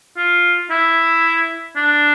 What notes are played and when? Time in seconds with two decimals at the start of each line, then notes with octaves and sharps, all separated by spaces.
0.17 F4
0.70 E4
1.76 D4